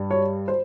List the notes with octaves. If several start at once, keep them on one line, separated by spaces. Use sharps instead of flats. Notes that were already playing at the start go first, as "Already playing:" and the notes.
Already playing: G2 G3
C#5
C5